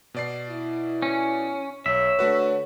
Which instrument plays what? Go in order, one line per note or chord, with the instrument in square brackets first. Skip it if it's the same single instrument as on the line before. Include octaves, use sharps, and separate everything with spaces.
[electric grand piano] B2 D5 C7
[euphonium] E4
[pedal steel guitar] C#4
[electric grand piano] B1 [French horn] C#5 [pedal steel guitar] E5
[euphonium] D3 [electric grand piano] A3 F#4 B4